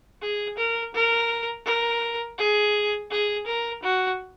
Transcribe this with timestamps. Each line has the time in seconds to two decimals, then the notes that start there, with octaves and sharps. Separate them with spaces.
0.22 G#4
0.58 A#4
0.94 A#4
1.66 A#4
2.38 G#4
3.11 G#4
3.47 A#4
3.83 F#4